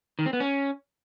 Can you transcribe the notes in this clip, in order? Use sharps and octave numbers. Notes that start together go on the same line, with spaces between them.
D#3
C4
B3
C#4